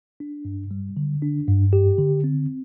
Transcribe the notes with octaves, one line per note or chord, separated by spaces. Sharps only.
D4
G2
G3
D3
D4
G2
G4
D3
C4